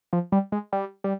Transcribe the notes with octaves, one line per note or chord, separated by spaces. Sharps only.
F3
G3
G#3
G3
G3